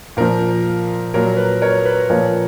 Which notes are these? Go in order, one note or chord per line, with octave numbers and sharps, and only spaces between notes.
A#2 F3 A#4
A#2 F#3 A#4
B4
A#4 C#5
B4
A#2 F3 A#4 C#5